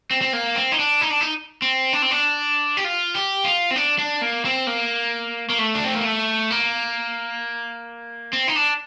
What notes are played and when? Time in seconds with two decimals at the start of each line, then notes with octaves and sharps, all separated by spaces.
0.11 C4
0.21 C4
0.33 A#3
0.55 C4
0.72 D#4
0.79 D4
1.01 D#4
1.10 D4
1.21 D#4
1.62 C4
1.93 D4
2.02 C4
2.11 D4
2.77 G4
2.84 F4
3.15 G4
3.45 F4
3.71 C4
3.76 D4
3.98 D4
4.21 A#3
4.45 C4
4.67 A#3
5.50 A#3
5.59 A3
5.75 D4
5.84 C4
5.95 A#3
6.05 A3
6.50 A#3
8.33 C4
8.48 D#4
8.56 D4